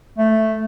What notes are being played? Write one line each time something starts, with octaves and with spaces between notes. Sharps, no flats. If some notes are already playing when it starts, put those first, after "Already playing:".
A3